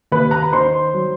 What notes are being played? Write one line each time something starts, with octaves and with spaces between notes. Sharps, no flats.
D#2 B4 B5
A#5
B5
D#3 C5 C6
F#3